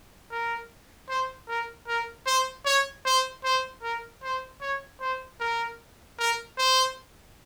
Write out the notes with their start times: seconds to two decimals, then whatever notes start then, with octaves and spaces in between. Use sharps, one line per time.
0.31 A#4
1.09 C5
1.48 A#4
1.88 A#4
2.27 C5
2.65 C#5
3.05 C5
3.44 C5
3.83 A#4
4.23 C5
4.61 C#5
5.01 C5
5.40 A#4
6.19 A#4
6.58 C5